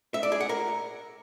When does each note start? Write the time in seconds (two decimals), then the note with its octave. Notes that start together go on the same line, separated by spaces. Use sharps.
0.14 E5
0.23 D5
0.32 G#4
0.41 F#5
0.49 A#4